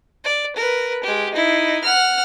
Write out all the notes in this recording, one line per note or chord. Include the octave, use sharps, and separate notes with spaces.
D5
A#4 B4
G#3 G4
D#4 E4
F#5 F6